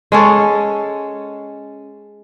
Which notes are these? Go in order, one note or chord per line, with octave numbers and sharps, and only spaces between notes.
G#3 C#4 A4 C#5